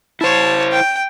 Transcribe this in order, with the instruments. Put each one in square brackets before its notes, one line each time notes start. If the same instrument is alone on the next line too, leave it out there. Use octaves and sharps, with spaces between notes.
[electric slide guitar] E4 C5 [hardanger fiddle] C#5 A5
[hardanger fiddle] G5